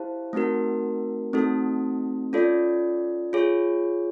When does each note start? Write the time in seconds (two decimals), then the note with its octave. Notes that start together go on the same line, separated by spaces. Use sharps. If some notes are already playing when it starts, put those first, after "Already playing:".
Already playing: E4 G4 C5 F5 A5
0.33 A3 C4 D#4 F#4 A#4
1.33 A3 C4 D#4 F#4 A4
2.33 C#4 F4 A4 D5
3.33 F4 G#4 C#5